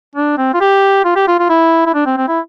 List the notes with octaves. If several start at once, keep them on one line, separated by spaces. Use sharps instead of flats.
D4
C4
F4
G4
F4
G4
F4
F4
E4
E4
D4
C4
C4
E4